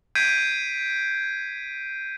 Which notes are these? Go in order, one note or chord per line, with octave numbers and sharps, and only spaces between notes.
G6 G#6 B6 C7 D7 D#7